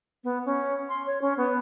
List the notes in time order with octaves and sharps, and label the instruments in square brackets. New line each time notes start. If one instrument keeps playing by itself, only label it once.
[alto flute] B3
C#4
C6
C#5
C#4
B3